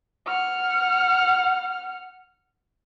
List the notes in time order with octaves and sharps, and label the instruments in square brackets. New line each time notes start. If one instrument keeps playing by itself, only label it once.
[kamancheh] F#5 F6